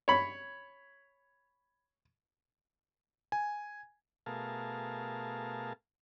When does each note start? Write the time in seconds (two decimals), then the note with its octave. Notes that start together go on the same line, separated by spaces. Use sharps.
0.08 C#5 B5
3.32 G#5
4.26 B2 A3 G#4 A#4 F5 A5